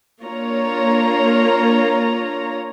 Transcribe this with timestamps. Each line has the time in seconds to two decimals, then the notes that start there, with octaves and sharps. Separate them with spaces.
0.22 A#3 D4 F4 C#5 A#5